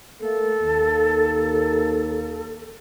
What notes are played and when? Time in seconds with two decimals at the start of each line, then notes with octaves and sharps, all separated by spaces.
0.20 A3 A#3 A4
0.61 D#2 A#3